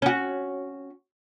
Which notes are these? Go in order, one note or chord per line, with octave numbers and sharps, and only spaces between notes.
C#4 F#4